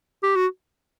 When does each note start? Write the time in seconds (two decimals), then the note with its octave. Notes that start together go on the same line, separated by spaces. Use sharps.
0.23 G4
0.35 F#4